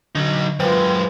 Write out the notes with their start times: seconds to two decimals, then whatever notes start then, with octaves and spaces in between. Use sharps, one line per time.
0.15 D3 F#3 D#4
0.60 F#2 G#3 F4 B4 C5 G5